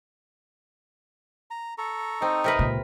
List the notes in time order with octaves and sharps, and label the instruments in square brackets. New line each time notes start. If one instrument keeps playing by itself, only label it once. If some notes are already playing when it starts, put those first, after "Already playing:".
[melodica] A#5
A4 A#5 C#6
[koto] C4 [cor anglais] D#4
[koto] C3 A#4 B4
[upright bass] C#2 A#2